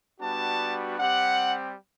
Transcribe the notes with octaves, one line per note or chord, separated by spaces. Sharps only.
G3 B3 D4 F#4 A5
G3 C4 G4 F#5